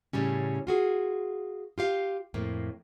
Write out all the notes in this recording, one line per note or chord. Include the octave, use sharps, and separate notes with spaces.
A2 C#3 G3 C#4
F4 F#4 G#4
F4 G4 F5
F2 A2 A#3